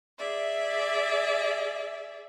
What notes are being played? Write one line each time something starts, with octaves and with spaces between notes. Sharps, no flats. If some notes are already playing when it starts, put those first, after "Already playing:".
G#4 D5 E5